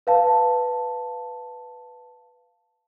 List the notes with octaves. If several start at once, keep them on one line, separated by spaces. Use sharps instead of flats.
B4 F5 A5